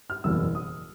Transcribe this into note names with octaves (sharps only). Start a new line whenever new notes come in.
F6
F#1 E2 B2 E6
D#6